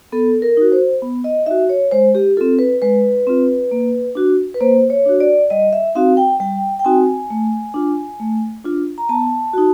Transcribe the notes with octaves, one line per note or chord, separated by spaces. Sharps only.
B3 A4
A#4
D#4 F#4
C5
B3
D#5
D#4 F#4 E5
C#5
G#3 C5
G4
C4 F4 A4
B4
G#3 B4
C4 F4
A#3
D4 F#4
B4
A#3 C5
C#5
D4 F#4
D5
G3 D#5
E5
C4 D#4 F#4 F5
G5
G3 G5
G5
C4 D#4 F#4 G#5
A3
D4 F4
A3
D4 F4
A#5
B3 A5
D#4 F#4